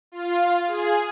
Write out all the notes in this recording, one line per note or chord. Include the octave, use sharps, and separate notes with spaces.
F4
G#4